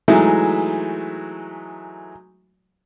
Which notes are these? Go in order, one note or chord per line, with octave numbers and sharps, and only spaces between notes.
E3 F#3 G#3 A3 D#4 E5